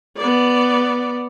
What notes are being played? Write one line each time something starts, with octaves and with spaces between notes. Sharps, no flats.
B3 D5